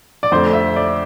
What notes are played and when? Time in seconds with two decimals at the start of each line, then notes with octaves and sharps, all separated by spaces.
0.23 D5
0.32 F2 D3 A3 C5
0.53 E5
0.76 D5